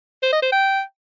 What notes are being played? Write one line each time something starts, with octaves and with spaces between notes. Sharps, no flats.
C5
D#5
C5
G5